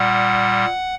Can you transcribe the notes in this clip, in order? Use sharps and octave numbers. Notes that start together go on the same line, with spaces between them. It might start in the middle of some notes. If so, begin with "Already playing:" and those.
Already playing: A#2 G3 F#5